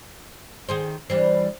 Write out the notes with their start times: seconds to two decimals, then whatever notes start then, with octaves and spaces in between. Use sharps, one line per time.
0.69 D#3 G#4 C5
1.10 E3 G3 D4 C5